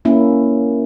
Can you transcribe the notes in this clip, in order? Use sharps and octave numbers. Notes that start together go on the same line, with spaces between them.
A#3 C#4 E4